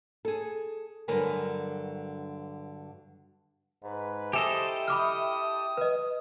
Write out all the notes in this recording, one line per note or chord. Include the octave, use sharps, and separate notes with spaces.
G#4 A4
G2 D3 F#3 A#4 B4 G#5
G#2 B4
E4 G4 A4 C5 D#5 G#5
B5 D6 D#6 F6
B4 D#5